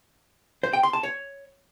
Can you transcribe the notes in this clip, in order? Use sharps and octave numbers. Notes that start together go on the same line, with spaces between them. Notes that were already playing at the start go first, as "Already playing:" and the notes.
C5
G5
C6
A5
C#5